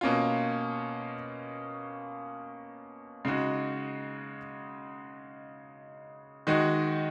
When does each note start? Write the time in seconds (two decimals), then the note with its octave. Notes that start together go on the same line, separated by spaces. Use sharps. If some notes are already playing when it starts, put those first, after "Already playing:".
0.01 B2 A#3 C#4 F4
3.25 C#3 G#3 D#4 F#4
6.47 D#3 G#3 D#4 F#4